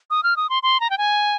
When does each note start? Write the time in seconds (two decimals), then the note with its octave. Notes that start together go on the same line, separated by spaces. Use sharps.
0.10 D#6
0.23 F6
0.37 D#6
0.50 C6
0.63 C6
0.80 A#5
0.90 G5
0.98 G#5